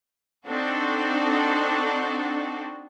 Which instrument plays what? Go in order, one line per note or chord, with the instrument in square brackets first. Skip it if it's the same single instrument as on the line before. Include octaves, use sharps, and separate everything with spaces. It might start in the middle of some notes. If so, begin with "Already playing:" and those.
[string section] C4 D4 D#4 F#4 A4